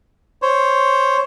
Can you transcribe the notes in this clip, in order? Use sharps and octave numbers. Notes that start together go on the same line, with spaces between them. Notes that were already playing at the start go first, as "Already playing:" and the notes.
C5 C#5